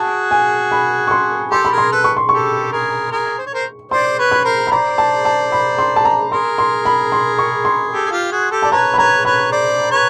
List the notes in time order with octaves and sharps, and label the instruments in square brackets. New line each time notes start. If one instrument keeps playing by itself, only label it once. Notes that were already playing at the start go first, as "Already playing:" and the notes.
Already playing: [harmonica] F#4 G#4 [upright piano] A5
[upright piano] G#5
B5
C#6
C6
[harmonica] G4 A4 [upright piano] C6
[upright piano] B5
[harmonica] G#4 A#4
[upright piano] C6
[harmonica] A4 B4
[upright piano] C#6
C6
[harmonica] G4 A4 [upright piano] C#6
[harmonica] G#4 A#4
G#4 A#4
C5
C#5
A#4 C5
[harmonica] C5 D5 [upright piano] C6
[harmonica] B4 C#5
[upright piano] B5
[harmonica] A#4 C5
[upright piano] B5
[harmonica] C5 D5 [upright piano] A#5
[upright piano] A5
A5
B5
C6
A5
A#5
[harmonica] G#4 A#4 [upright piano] C6
[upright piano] C6
B5
C6
C#6
C6
[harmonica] G4 A4
G#4
F4 G4
F#4 G#4
G4 A4
[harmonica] D5 [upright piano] A5
[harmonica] B4 C#5 [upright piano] A#5
[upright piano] B5
[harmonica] B4 C#5 [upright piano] A#5
[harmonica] B4 C#5 [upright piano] B5
[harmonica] C5 D5
B4 C#5